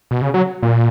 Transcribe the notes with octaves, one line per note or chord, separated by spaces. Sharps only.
B2
C#3
F#3
A#2